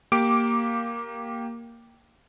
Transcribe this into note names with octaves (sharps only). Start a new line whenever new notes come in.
A#3 G4 D6 D7